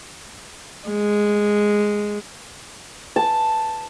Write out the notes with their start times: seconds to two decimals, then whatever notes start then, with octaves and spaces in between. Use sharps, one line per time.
0.88 G#3
3.16 A5